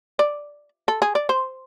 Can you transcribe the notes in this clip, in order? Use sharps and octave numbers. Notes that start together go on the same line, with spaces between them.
D5
A4
G#4
D5
C5